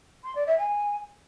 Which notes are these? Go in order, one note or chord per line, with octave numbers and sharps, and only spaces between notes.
C6
D5
E5
G#5